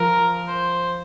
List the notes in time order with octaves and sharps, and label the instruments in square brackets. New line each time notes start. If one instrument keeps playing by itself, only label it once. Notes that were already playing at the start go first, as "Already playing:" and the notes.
Already playing: [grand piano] F3 [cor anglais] A#4
[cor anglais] C5